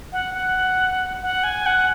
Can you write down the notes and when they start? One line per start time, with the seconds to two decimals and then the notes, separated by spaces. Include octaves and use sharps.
0.13 F#5
0.34 F#5
1.22 F#5
1.44 G#5
1.66 F#5